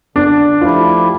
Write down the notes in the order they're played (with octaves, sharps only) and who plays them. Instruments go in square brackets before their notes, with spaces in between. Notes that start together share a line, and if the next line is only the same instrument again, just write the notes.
[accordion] D3 [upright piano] D4
[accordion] F3 A3 E4 G4 [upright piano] F4